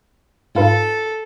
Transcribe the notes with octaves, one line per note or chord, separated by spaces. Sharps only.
G#2 F4 A4 B4